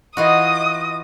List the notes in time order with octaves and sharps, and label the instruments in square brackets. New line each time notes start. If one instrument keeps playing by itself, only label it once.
[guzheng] E3 F4 F#4 [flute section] D#5 [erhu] D#6